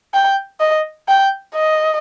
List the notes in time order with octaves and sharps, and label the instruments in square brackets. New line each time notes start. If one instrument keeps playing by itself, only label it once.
[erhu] G5
D#5
G5
D#5